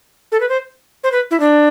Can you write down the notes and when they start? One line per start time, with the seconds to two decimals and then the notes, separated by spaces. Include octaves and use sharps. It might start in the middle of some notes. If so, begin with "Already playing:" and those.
0.32 A4
0.40 B4
0.49 C5
1.04 C5
1.12 B4
1.31 E4
1.40 D4